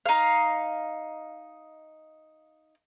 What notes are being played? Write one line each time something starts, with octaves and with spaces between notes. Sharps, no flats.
D#4 F5